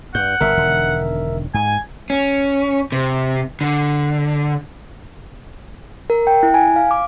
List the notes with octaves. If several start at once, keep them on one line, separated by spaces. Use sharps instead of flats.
G2 F#5 G6
G1 G2 A#2 A#4 E5
E1 D3 D#3
G#2 G#5
C#4
C3
D3
A#4
G5
E4
G#5
F5
D6